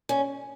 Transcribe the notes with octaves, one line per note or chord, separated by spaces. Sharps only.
C#4